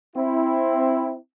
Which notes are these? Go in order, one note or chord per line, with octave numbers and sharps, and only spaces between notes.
C4 E4